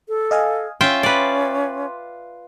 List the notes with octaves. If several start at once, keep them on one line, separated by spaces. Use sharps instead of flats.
A4
D#5 F5 G#5
C#4 F4 E5 G5 C6
B4 D5